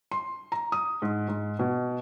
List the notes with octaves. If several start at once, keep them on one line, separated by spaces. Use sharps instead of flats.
C6
A#5
D#6
G#2
G#2
B2